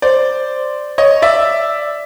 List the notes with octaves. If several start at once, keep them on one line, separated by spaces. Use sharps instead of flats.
C5 D5
C#5 D#5
D5 E5